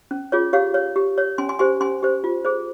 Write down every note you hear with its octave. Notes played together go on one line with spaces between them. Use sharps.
C#4
F4 G#4 C#5
G4 C#5 F5
C#5
G4
C#5
C#4 G#5 C6
G#5 C6
G4 C5 G#5 C6
C#4 G#5 C6
G4 C5
F4
G#4 C5